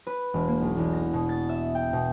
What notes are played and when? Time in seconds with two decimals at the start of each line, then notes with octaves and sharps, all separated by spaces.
0.07 B4
0.34 E1
0.47 A#3
0.61 B1
0.77 E2
0.93 A#6
1.13 B2
1.29 A6
1.49 E5
1.75 G5
1.93 B2